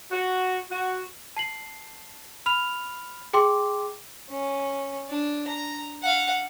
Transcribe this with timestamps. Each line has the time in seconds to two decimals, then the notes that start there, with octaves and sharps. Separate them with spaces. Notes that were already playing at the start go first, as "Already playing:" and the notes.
0.11 F#4
0.70 F#4
1.37 A5 C7 F#7
2.46 B5 F6 F7
3.33 G#4 G5 C6 D6
4.30 C#4
5.09 D4
5.47 A#5
6.02 F5 F#5